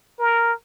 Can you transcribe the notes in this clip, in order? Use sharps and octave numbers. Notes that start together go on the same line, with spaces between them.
A#4